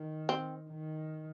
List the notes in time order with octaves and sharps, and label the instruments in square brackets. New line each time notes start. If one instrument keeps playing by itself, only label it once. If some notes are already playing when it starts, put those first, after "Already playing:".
Already playing: [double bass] D#3
[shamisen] C4
[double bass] D#3